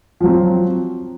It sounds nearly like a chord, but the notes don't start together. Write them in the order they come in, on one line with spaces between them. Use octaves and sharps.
F3 F#3 C4